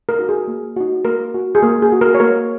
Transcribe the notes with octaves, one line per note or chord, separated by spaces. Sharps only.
A#4
D#4 F#4
G#4
A#3
D#4 F#4
A#3 A#4
F#4
G#4
A#3 A#4
G#4
F#4
A#4
C#5
A#3 A#4